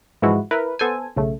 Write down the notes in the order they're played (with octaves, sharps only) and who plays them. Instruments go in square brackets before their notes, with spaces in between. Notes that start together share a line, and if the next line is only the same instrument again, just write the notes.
[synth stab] G#2 E3 F3 G#3 E4 F#4
E4 A#4 B4
B3 A4 C5 G#5
B1 C#3 A3